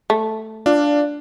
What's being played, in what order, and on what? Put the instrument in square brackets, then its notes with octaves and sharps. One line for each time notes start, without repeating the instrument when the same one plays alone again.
[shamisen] A3
[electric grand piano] D4 [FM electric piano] F4 D5 F5